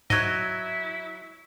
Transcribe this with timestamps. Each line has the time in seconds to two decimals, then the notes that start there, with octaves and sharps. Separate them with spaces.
0.10 G#2 F#3 E4 D#5 G#6 A#6